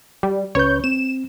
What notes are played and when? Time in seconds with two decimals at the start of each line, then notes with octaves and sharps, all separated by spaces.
0.23 G3
0.55 C#2 C#4 B4 C#5 G6
0.84 C4 E7